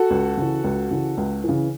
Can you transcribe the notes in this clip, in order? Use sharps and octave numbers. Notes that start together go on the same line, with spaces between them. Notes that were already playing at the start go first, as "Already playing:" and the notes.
Already playing: F#4 A4
C#2
C#3 E3
C#2
C#3 E3
C#2
C#3 E3